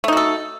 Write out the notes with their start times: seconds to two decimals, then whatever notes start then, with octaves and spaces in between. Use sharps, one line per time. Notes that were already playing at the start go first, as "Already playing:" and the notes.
0.04 A3
0.08 D#4
0.13 F#4
0.17 A4